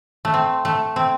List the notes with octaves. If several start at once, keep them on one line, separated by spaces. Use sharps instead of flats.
A3
C4
A3
C4